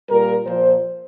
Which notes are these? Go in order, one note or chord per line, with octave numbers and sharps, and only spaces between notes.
A#2 G3 A#4
A#2 F3 C5